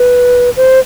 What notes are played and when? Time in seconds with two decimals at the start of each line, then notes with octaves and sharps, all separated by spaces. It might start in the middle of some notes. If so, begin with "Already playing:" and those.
Already playing: B4
0.57 C5